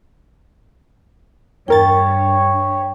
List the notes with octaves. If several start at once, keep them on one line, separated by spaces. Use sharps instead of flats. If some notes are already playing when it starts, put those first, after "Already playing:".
E2 G2 A#4 C#5 G5 A6